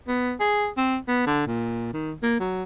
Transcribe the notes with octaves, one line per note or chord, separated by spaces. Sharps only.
B3
G#4
C4
B3
D3
A#2
D#3
A#3
F#3